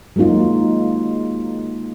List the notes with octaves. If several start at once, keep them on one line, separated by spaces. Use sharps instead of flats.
F#3 G#3 A#3 D#4 F4